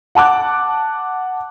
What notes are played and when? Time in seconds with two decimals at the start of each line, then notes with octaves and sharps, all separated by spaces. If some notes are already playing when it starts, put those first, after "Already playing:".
0.15 F#5 A5 D6 F#6